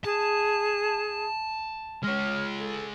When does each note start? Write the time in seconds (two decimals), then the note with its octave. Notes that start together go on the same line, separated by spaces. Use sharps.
0.05 G#4 A5
2.03 G#3 C#5 F6
2.59 A4